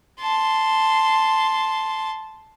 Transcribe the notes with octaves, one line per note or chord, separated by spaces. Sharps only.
A5 C6